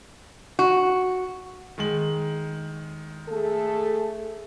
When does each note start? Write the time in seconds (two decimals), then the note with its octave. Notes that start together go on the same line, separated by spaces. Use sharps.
0.59 F#4
1.78 D#3 G#3 F#7
3.29 A3 G#4 A4